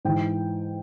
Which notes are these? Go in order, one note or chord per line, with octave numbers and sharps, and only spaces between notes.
G#2 E3 G5